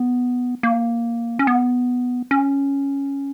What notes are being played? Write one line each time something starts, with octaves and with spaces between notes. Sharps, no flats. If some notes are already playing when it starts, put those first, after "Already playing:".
Already playing: B3
A#3
C#4
B3
C#4